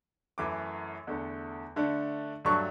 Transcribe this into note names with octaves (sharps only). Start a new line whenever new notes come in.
F#2 E3 A3 D6
E2 D3 A3
D3 A3 D4
G2 F#3 A3 D4 C#6